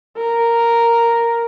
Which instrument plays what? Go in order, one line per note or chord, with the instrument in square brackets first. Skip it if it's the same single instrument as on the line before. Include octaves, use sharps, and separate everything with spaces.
[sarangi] A#4